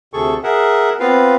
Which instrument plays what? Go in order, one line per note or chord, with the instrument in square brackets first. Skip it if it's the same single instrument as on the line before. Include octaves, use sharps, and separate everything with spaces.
[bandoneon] D2 C3 G#4 A4 C#6
G#4 A#4 E5 F#5
B3 C4 F4 B4 F5